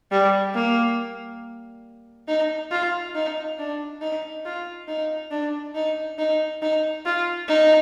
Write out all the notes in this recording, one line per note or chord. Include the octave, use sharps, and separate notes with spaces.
G3
A#3
D#4
F4
D#4
D4
D#4
F4
D#4
D4
D#4
D#4
D#4
F4
D#4